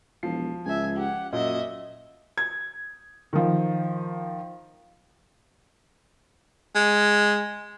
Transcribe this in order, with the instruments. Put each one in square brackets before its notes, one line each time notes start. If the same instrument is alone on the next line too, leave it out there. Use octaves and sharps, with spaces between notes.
[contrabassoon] E1 [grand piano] F3 C7
[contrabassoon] C#2 [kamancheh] E5 G#5
[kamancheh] G4 F#5
[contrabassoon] F#2 [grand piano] A#2 [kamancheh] D#5 E5
[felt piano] G#6
D#3 F3
[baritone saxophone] G#3